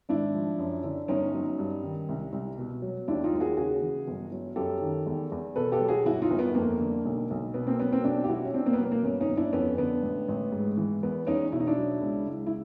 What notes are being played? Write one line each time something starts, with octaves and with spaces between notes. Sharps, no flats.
G#1 D4 E4
F3
F#2
D3
G1 C#4 D#4
F#3
G2
D#3
C2
C2
B2
F#3
D#2 D4 E4
D#4 F4
D#2
F#4 G#4
C#3 F#4 G#4
E3
G1
F#3
F#2 G4 A4
D#3
E2
E2
B2 A4 B4
G4 A4
F#3
F#4 G#4
G1 E4 F#4
D#4 F4
G1
B3
F2 A#3
D3
B1
B1
B2 B3
A#3 C4
F#3 B3 C#4
A#3 C4
B1 C4 D4
G4
B1 E4 F#4
C#4
B2 C4 D4
A#3 C4
B3
F#3 A#3
A#3
G1 B3 C#4
C#4 D#4
G1
D4 E4
F2 B3 C#4
D3 B3
A1
A1
G#2
E3
E2 B3
E2 C#4 D#4
B2 E4
D#4
D4 E4
F#3
C#2
C#2
E4